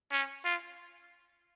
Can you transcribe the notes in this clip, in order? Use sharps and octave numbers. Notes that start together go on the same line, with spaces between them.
C#4
F4